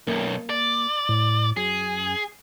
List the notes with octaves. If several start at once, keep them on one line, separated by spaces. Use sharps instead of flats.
B1 F#2 A#3
D5
A2
F#2 G#4